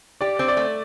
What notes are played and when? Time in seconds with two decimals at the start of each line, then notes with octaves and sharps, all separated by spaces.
0.21 G4 D5
0.39 C4
0.48 D5
0.57 A3